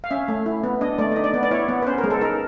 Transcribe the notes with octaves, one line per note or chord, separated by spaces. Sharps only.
F5
C#4 E5
A3
E4
B3
D4 D#5
A3 D5
D#4 D#5
D5
B3
D5
E4 C#5
B3
B4
C#4 C5
A#4
G#3
A4
D#4 A#4